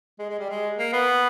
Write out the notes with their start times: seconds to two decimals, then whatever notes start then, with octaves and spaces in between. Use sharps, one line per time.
0.19 G#3
0.29 G#3
0.39 G3
0.49 G#3
0.78 A#3
0.93 B3